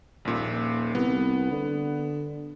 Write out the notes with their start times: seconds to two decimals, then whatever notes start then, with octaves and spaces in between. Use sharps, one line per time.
0.25 D#1 A#1 A#2
0.95 C2 B3
1.51 D3